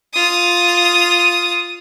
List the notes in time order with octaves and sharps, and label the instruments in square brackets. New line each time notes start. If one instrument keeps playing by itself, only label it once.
[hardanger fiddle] F4 D#6